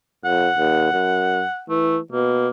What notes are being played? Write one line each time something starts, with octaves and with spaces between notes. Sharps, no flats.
F2 F#5
D#2
F#2
E3 A3
B2 A#3